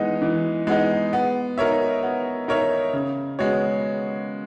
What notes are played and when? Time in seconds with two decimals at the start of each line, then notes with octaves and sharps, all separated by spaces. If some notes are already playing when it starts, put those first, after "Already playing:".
Already playing: E3 G#3 B3 D#4
0.22 E3
0.67 G#3 B3 D#4
1.13 B3
1.58 D#4 A#4 C#5 E5
2.03 B3
2.48 D#4 A#4 C#5 E5
2.93 C#3
3.39 G#3 B3 F#4 C#5